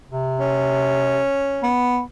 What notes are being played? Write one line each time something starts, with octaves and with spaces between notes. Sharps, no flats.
C3
C#4
B3